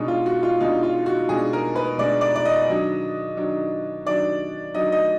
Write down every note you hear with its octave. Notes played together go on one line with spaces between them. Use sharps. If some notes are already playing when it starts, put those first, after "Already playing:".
Already playing: B2 G#3 D4 D#4
F4
F#4
F4
B2 G#3 D4 D#4
F4
F#4
B2 G#3 D4 G#4
A#4
B4
B2 G#3 D4 D5
D5
D5
D#5
D#3 F#3 D4
D#3 F#3 D4
D#3 F#3 D4 D5
D#3 F#3 D4 D#5
D#5